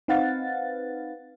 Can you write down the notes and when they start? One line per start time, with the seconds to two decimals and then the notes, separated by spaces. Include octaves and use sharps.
0.08 C4 D#4 B4 F5 F#5 A6